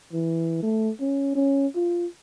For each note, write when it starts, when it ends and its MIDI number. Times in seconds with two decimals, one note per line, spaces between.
0.13 0.58 52
0.63 0.90 57
1.01 1.35 61
1.35 1.67 61
1.75 2.06 65